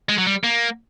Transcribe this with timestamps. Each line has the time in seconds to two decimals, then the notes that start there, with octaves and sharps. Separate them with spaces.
0.09 G#3
0.18 F#3
0.27 G3
0.44 A#3